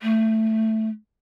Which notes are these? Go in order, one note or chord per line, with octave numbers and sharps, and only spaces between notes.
A3